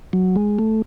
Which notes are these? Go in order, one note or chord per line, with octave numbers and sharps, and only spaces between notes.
F#3
G#3
A3